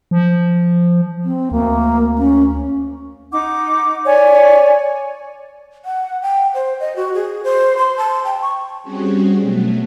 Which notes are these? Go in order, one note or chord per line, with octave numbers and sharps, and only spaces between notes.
F3
C4
D2 A#3
C#4
D#4 F#5 D6
C#5 D5 G#5
F#5
G5
C5
D#5
F#4
G#4
C5
C6
A5
G5
C#6
G3 C4 C#4 F#4 G#4
B2 F#3 A3 B3